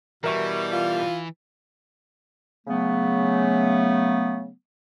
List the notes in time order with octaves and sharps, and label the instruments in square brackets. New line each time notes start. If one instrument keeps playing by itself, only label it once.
[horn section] B2 G3 [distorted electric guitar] E3 [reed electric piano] A#4 E5 C#6
[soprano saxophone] F4
[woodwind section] C#3 F#3 A3 B3